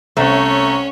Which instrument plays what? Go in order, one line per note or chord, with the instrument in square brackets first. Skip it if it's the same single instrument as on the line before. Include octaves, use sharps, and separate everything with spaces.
[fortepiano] C2 C5 [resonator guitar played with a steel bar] A3 [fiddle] C#4 C#5 [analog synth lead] A#5